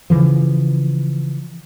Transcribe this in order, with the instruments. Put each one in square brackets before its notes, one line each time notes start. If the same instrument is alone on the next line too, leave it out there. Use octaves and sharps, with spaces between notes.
[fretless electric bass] C#3 E3 F3